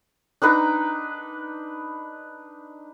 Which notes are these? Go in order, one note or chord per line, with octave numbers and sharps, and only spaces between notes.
D4 D#4 B4 A#5